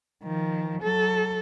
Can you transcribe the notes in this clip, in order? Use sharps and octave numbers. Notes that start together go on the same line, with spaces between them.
D#3 F3
F#3 A4